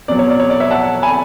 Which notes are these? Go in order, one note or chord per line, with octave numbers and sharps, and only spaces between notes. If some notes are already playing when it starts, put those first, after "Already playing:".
E2 B2 F#3 D5
C#5
D5
C#5
D5
C#5 E5
F#5 A5
G#5 B5